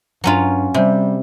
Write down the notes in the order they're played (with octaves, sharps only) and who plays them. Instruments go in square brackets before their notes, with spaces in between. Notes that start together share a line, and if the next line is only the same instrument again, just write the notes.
[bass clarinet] G2 [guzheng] F#3 C#4 F4
[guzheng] C3 [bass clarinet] G3